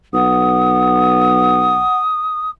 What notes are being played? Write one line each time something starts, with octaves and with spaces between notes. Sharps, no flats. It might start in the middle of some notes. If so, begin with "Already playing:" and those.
B1 F#5 D#6